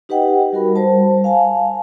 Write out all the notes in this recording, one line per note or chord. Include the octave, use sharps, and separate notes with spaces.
D#4 G4 B4 D#5 F#5 G5
G3 F#4 A#4 B5
G3 C5 A5
F5 G#5 A5